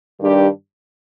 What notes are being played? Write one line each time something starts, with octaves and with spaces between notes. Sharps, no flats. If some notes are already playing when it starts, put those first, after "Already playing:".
G2 D#3 G3 D4 G4